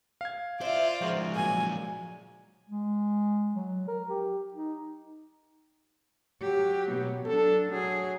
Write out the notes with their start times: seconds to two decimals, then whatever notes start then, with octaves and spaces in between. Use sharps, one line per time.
0.21 F5 G#6
0.61 E4 F4 C5 D5 E5
1.01 C#3 F3 G#3 F#4 A#4 C5
1.36 A#2 F#3 G#5
2.69 G#3
3.55 F#3
3.88 A#4
4.09 G4
4.54 D#4
6.41 F#3 G4
6.88 B2 B3
7.26 F#3 D4 A4
7.71 F#3 G#4